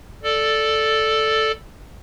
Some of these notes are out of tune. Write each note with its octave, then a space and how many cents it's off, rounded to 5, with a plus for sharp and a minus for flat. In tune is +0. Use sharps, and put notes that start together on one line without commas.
A4 +0 D5 +0